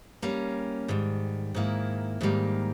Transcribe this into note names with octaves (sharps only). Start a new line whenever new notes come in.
G3 A#3 C#4
G#2 D#3 G3
G#2 D#3 A#3 E4
G#2 D#3 G3 A#3